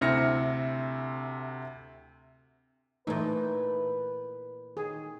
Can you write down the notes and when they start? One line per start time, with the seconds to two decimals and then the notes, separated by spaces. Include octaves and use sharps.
0.01 D2 C3 E4 F6 A#6 C#7
3.07 A#2 E3 A3 D#4 B4
4.77 D#3 G#4